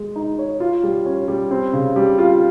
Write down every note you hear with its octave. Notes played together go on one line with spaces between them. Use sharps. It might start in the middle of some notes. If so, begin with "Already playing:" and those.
Already playing: G#3
D#4
C#5
F4
G3
C#4
G3
C4
C#3
G3
F4